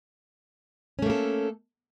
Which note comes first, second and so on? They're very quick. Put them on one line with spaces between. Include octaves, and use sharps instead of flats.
C#4 A3 A#3 A4